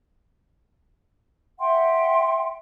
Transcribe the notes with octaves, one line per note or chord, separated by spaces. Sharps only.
E5 F#5 G5 C6